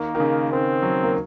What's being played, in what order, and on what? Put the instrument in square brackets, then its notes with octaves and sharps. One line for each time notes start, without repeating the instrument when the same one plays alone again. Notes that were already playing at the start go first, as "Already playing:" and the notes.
Already playing: [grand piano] D#3 [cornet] A#3
[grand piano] D#3
C#3
[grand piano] D#3 [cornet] C4
[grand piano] F#3
A#3